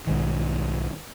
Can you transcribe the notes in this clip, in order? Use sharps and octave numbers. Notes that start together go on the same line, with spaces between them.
B1 G#2 D#3